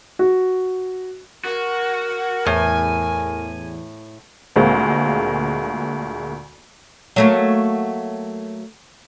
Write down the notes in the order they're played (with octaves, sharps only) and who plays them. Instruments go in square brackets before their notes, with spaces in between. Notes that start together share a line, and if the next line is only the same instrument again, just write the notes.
[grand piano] F#4
[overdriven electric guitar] F#4 [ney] A#4
[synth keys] E2 [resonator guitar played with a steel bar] A2 [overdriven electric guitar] G#5
[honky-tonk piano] D2 A#2 G#3 A#3 C4
[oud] F#3 A3 A#3